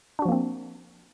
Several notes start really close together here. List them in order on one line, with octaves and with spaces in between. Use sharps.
D4 F#4 F3 A#3 C4